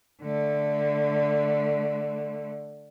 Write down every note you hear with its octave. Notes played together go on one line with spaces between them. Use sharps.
D3 A3